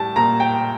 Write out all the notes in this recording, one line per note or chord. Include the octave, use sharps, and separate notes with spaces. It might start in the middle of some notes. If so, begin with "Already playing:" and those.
Already playing: A2 G3 A5
A#2 A#5
G5